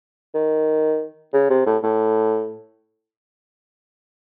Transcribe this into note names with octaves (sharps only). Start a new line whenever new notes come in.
D#3
C#3
C3
A2
A2